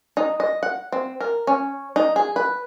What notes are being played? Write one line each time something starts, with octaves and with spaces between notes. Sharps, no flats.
D#4
D#5
F#5
C4
A#4
C#4
D#4
G#4
B4